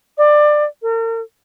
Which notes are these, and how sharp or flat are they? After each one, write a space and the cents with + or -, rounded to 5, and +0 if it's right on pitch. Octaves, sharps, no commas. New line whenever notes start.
D5 +20
A#4 -40